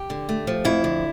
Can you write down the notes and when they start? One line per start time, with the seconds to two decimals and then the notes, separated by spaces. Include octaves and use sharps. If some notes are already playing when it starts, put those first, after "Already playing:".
Already playing: G4
0.10 D3
0.29 A3
0.47 F3
0.65 F2 E4
0.84 D3